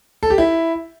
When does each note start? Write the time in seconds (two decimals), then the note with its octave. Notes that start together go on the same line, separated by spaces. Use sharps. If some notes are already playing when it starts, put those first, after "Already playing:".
0.23 A4
0.30 G4
0.38 E4